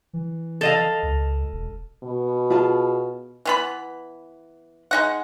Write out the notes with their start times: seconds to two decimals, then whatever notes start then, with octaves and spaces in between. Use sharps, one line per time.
0.13 E3
0.61 A4 D#5 F5
1.03 C#2
1.52 E1
2.03 B2
2.50 F4 G#4 A5
3.45 E3 B3 B5
4.91 G#3 D#4 F#5